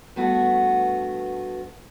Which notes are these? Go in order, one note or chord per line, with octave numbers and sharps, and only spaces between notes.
G2 A3 B3 F#4